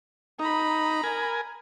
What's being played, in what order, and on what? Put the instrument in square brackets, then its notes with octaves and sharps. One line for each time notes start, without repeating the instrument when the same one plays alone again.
[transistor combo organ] D#4 [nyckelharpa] A#5 B5
[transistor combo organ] A#4 G#5